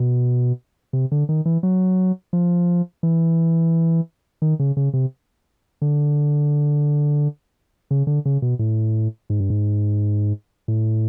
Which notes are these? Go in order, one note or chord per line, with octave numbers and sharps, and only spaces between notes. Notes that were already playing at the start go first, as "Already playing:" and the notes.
Already playing: B2
C3
D3
D#3
E3
F#3
F3
E3
D#3
C#3
C#3
C3
D3
C#3
D3
C#3
B2
A2
G#2
G2
G#2
A2